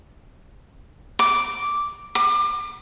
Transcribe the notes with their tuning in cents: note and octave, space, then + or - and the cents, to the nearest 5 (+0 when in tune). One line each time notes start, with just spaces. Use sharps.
D6 -5
D6 +30